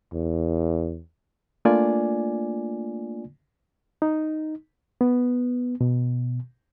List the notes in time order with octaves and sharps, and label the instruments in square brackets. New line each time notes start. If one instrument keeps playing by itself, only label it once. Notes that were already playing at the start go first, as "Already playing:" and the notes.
[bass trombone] E2
[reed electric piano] A3 A#3 D4 F4 D5 G#5
D#4
B3
B2